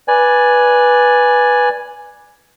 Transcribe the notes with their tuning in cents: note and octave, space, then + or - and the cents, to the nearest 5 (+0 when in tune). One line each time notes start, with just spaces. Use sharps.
B4 -10 D5 +0 G#5 +0